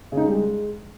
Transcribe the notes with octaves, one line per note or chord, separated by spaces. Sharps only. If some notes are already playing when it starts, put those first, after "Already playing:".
C#3
D#4
G#3
G3
G#3